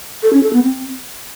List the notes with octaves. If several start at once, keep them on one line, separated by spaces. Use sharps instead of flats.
A4
C#4
A4
B3
C4